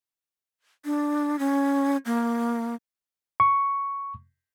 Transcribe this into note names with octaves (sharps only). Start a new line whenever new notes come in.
D4
C#4
A#3
C#6